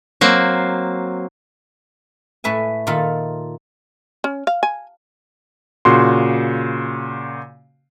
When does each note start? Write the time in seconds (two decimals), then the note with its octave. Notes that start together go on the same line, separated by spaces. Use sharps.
0.21 F#3 A#3 C4
2.44 A2 A3 B4 E5 G#5
2.87 A#2 D#3 A#3 F4 A4 B5
4.24 C#4
4.47 F5
4.63 G#5
5.85 A#2 C#3 F#4 C6